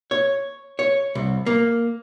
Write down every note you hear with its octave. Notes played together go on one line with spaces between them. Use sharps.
C#5
C#5
C2
A#3